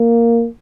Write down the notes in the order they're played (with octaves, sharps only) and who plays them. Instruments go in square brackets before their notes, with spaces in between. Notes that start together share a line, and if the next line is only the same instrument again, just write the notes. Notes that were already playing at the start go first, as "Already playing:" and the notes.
Already playing: [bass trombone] A#3